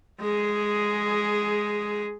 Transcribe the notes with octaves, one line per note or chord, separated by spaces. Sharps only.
G#3 G#4